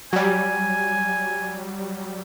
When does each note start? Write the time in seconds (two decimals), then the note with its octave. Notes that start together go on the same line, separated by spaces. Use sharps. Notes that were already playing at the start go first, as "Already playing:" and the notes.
0.13 F#3 G3 G#5